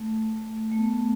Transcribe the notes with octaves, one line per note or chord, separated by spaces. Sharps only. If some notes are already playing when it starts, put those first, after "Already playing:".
Already playing: A3
A3
B3